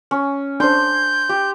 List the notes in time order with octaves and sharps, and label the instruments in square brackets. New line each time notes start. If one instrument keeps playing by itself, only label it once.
[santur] C#4
[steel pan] D4 C5 [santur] C6 [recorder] G6
[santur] G4